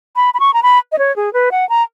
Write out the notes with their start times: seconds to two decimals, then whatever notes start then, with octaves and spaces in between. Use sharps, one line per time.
0.16 B5
0.34 B5
0.40 C#6
0.54 A#5
0.63 B5
0.92 D#5
0.99 C#5
1.16 G#4
1.33 B4
1.51 F#5
1.69 A#5